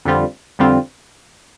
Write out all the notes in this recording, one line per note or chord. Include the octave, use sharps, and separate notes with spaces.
F2 D3 G3 C4 F4
F2 D3 G3 C4 F4